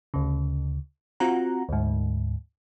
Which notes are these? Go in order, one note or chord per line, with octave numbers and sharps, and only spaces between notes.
D2 C#3
C4 F4 F#4 F#5 A#5
D2 G#2